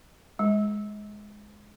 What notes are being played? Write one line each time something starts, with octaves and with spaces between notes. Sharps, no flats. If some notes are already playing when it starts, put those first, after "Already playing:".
G#3